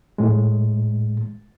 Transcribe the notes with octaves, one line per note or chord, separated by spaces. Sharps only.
A2 G#3